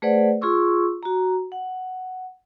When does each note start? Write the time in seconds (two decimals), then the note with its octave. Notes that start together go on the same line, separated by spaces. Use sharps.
0.02 A3 G#4 B4 C5 D5 F#5
0.41 F4 G#4 C6 C#6 E6
1.03 F#4 A#5
1.52 F#5